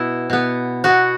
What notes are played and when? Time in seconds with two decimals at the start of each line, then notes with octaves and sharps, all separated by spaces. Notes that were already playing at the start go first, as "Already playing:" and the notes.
Already playing: B2 B3 E4
0.30 B2 B3
0.84 B2 B3 F#4